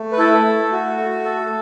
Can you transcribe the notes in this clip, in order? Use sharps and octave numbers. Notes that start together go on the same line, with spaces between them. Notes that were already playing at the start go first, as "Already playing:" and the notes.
Already playing: A3
B4
E4 A4
A3
F#4
A3
A4